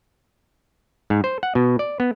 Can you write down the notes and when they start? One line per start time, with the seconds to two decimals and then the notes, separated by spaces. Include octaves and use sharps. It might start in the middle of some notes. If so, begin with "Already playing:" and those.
1.10 G#2
1.24 C5
1.43 F#5
1.55 B2
1.79 D5
2.00 B3